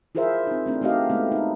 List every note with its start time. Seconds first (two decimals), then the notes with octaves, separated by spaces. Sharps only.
0.15 E4 F4 G#4 A#4 C5 E5
0.47 C4 D#4
0.66 A3 C4 D4
0.82 A3 D#4 F#4 G4 D#5 F5
1.10 G#3 A3 B3
1.32 D#4